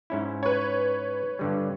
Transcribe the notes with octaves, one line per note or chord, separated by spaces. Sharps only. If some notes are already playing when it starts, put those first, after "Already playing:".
G#2 C#4 E4
B4 C#5
G2 D3 G3